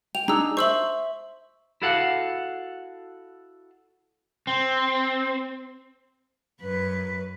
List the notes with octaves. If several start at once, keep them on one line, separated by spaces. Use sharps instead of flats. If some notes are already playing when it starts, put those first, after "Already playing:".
G5 F7
D4 D#4 G#4 A#5 E6
C5 E5 C#6 E6 F#7
E4 F#4 A4 F5 F#5
C4
F#2 B4